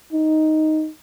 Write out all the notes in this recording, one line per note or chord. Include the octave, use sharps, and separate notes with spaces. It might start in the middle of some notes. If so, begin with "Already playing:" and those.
D#4